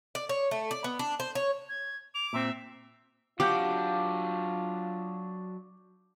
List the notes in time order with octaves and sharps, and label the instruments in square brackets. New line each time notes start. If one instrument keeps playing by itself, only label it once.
[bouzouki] D5
C#5
A3
D5
B3
D4
C5
C#5
[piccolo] G#6
[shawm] D6 [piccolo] F7
[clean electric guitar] A#2 C4 [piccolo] E5
[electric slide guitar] F#3 D4 [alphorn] F4 [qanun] G4 F#5 [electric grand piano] D6 G6